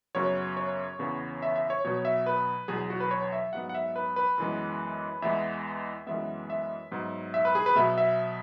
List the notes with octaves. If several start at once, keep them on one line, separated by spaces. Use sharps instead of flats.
F#2 C#3 F#3 B3 C#5
C#5
E2 C#3 E3 B3
E5
E5
C#5
B2 F#3 B3 C#5
E5
B4
E2 B2 F#3 G#4
F#4
B4
C#5
E5
G#2 F#3 B3 F#5
F#5
E5
B4
B4
F#2 E3 G#3 B3
E2 E3 G#3 B3 E5
F#2 E3 G#3 B3 E5
E5
G#2 F#3 B3
E5
B4
G#4
B4
B2 F#3 B3 E5
E5